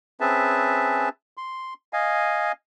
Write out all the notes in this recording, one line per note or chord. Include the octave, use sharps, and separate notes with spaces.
C4 C#4 G#4 B4 E5 A5
C6
D#5 F5 G#5